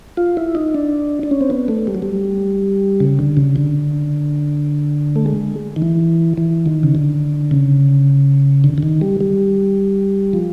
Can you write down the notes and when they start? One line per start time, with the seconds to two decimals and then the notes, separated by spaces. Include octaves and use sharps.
0.17 F4
0.37 E4
0.55 D#4
0.74 D4
1.23 D4
1.31 C#4
1.41 C4
1.50 B3
1.68 A3
1.87 G3
1.95 F#3
2.02 G3
3.00 C#3
3.19 D3
3.37 C#3
3.56 D3
5.16 A3
5.26 G#3
5.76 D#3
5.82 E3
6.37 E3
6.66 D#3
6.83 C#3
6.95 D3
7.51 C#3
8.64 D3
8.78 D3
8.83 D#3
9.01 G3
9.21 G3
10.33 F3